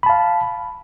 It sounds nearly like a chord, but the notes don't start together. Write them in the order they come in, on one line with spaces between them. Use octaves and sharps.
B5 A5 F5